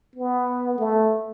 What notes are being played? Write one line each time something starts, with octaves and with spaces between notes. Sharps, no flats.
B3
A3